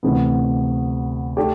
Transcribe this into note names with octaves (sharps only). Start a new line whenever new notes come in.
D2 C3 E3 B3
A3 D4 G4